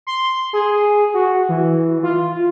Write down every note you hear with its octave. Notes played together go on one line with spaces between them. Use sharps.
C6
G#4
F#4
E3
F4